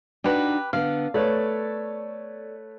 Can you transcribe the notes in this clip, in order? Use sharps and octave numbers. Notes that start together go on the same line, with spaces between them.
D4 D#4 F#4 G4 B4
D3 B3 F5
A3 A4 B4 C#5 D5